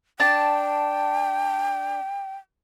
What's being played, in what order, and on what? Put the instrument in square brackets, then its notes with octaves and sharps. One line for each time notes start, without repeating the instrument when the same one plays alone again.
[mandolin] D4 A5 [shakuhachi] G5